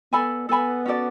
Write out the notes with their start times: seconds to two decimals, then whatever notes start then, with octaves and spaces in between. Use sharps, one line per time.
0.12 B3 A4 D5 G#5 B5
0.49 B3 A4 D5 G#5 B5
0.86 C#4 F#4 A4 D5